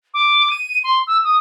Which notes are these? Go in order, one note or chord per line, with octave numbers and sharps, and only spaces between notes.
D6
D#7
C6
E6
D#6